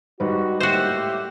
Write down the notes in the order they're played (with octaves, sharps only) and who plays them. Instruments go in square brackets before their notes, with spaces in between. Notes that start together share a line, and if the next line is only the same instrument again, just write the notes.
[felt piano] G#2 G3 B4 [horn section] F#4
[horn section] A2 A#3 E5 [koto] F#4 C5 [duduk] G4